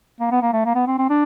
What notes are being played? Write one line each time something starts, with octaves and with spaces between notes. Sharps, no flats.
A#3
B3
A#3
A3
A#3
B3
C4
C4
D4